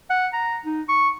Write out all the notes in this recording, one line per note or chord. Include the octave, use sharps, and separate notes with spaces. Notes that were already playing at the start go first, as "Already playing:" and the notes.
F#5
A#5
D#4
C#6